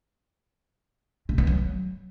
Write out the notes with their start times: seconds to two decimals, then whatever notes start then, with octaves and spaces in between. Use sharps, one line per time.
1.29 C3
1.38 B3
1.47 F#3